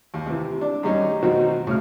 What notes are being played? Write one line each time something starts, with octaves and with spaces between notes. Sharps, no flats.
D#2
C3 E3
D4
F#2 D#3 G3 C#4 D#4
B2 D#3 F#3 C4 D#4 F#4
A2 C#3 F6